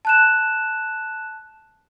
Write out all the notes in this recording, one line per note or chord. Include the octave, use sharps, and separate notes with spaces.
A5 F#6 E7